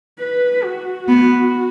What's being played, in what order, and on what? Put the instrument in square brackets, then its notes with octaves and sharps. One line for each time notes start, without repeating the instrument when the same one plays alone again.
[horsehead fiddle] B4
F#4
[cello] B3